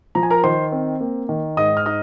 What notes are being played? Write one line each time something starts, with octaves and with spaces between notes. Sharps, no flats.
F3 A#5
G#5
A#4 A#5
D#3 C5 C6
C4
A#3
D#3
G#2 D#5 D#6
F6
D#4 D#5 D#6